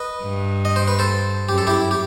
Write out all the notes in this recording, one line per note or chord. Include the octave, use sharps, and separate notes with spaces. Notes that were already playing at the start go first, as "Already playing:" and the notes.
Already playing: B4 D#5
G2
D#5
C5
B4
A4 C5
F#2 G4
A4
E4 G4
G4